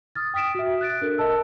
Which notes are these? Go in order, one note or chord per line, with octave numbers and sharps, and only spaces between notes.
D#6 F6 A6
G5 D#6 B6 D7 E7
F#4 E5
F#6 A6 D7
D4 A4 A#4
A#4 D#5 A5 E6